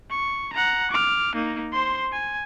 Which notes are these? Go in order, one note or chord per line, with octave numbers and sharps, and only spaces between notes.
C#6
F#5 A#5
D6 F6
A#3 D#4
C5 C6
G#5